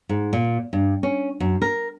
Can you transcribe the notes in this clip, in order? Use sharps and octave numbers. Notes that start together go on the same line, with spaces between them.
G#2
A#2
G2
C#4
F#2
A#4